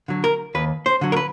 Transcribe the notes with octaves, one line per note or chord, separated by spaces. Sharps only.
D3 F#3
A#4
D#2 B4
C5
D3 F#3
A#4
B4